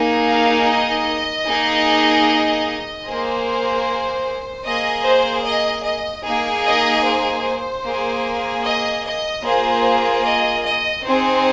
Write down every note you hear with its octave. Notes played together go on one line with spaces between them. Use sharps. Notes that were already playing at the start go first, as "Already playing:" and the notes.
Already playing: A#3 D#4 G#4
F5
D#5
A#3 D#4 G#4
A#3 G#4 C5
A#3 G#4 D#5
C5
D#5
D#5
A#3 D#4 G#4
D#5
C5
A#3 G#4
D#5
D#5
A#3 F4 G#4 C5
D#5
D#5
C4 D#4 G#4 C5